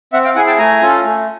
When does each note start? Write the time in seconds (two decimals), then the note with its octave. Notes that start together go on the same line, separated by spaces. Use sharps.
0.13 C4 E5 F#5
0.24 F5 G5
0.35 E4 G#4 F#5 G#5
0.47 G5 A5
0.58 A3 G#5 A#5
0.82 C#4 F4 A4
1.04 A3